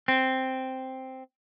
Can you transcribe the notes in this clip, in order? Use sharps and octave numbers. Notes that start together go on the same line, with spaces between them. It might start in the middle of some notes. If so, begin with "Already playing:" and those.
C4